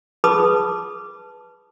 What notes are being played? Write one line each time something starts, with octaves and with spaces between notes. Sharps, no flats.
G#4 B4 A5 B5 D6 D#6